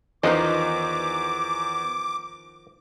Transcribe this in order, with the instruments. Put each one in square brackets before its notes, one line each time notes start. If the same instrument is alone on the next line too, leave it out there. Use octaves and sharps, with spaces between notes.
[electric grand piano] E2 [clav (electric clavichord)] D#3 F3 C5 [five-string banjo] D#4 B4 D#5 [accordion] D6